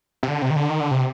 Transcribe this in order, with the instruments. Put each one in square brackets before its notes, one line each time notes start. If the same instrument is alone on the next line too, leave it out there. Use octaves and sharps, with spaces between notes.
[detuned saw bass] C3
D3
C3
D#3
D3
D#3
D3
C3